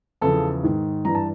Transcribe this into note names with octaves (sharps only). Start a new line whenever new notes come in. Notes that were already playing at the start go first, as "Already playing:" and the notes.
E2 C#3 F3 A4 A5
G#2 D#3
G2 E3 A#5
A5